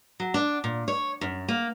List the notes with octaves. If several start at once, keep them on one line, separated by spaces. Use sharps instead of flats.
F#3
D4
A#2
C#5
F#2
A#3